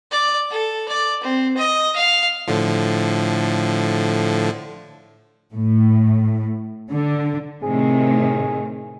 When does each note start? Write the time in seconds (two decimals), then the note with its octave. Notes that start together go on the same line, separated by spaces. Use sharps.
0.11 D5
0.51 A4
0.88 D5
1.23 C4
1.57 D#5
1.96 F5
2.48 A2 D3 F3
5.53 A2
6.90 D3
7.63 A2 C3 D#3 G#4